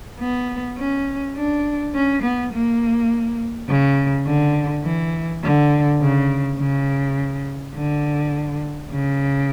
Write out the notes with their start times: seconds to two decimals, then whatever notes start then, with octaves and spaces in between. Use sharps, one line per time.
0.20 B3
0.78 C#4
1.36 D4
1.94 C#4
2.23 B3
2.53 A#3
3.69 C#3
4.27 D3
4.84 E3
5.43 D3
6.01 C#3
6.59 C#3
7.75 D3
8.91 C#3